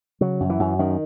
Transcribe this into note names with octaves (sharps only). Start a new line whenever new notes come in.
C#3 F#3
F#2
E3
F#2
F#2 D#3